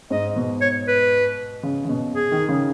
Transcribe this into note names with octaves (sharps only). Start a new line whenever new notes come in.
G#2 D#5
B2
C#5
B4
C#3
C#3
B2
G#4
D#3
C#3